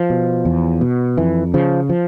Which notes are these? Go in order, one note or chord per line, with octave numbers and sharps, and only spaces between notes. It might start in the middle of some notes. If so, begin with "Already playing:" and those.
Already playing: F3
B2
E2
B2
F2 E3
C#3 F3
F3